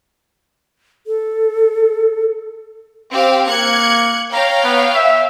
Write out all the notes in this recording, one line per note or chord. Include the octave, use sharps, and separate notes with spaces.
A4
C4 G4 F5
A#3 F#6 G#6 C#7
C#5 F5 G5 A#5
B3
E5